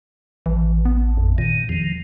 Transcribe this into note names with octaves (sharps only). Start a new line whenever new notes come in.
A1 E3
B3
F2
A#2 D#3
E2 D#3 F3